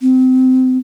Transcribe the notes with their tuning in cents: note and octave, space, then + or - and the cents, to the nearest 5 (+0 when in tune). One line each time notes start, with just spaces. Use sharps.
C4 -25